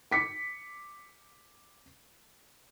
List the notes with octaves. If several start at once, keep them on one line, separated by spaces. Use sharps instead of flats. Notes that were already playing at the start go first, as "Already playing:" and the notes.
D6 B6 C#7